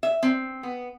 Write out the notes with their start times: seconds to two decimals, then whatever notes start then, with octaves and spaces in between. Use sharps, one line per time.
0.03 E5
0.23 C4
0.63 B3